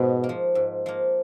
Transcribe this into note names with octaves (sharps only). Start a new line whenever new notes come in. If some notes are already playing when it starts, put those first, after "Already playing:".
Already playing: G#2 B2
A#3
F3
G#2
F3 A#3